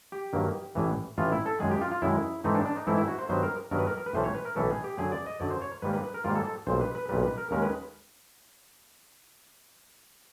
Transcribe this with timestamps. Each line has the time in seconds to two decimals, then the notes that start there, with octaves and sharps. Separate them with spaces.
0.12 G4
0.33 G2 D#3 F#3 A#3
0.75 A1 A2 E3
1.18 A1 A2 E3 F4
1.32 E4
1.46 A4
1.60 F#2 D#3 G#3 G#4
1.71 G4
1.81 F4
1.92 F4
2.02 F#2 D#3 G#3 E4
2.44 G#2 E3 A3 C4 D#4
2.55 D4
2.66 D4
2.76 D#4
2.87 G#2 E3 A3 C4 E4
2.98 E4
3.08 F#4
3.19 C5
3.29 G2 D#3 F#3 B3 C5
3.43 A#4
3.71 G2 D#3 F#3 B3 A#4
3.79 B4
3.87 A#4
3.97 A#4
4.06 B4
4.13 B1 A2 E3 A3 C#4 C5
4.24 C#5
4.35 B4
4.45 A#4
4.56 B1 A2 E3 A3 C#4 A4
4.70 G#4
4.84 G4
4.98 F#2 D3 F#3 G#4
5.12 D5
5.26 D#5
5.40 F#2 D3 F#3 D5
5.51 C5
5.62 C#5
5.82 G#2 D#3 G3 A#3 B4
5.93 B4
6.04 B4
6.14 A#4
6.24 G#2 D#3 G3 A#3 F4
6.35 A4
6.45 A4
6.67 B1 A#2 G3 C5
6.81 B4
6.95 B4
7.09 B1 A#2 G3 B4
7.23 B4
7.38 A#4
7.51 D#2 D#3 G#3 C#4 A#4
7.62 B4